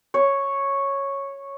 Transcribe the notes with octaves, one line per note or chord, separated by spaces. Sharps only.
C#5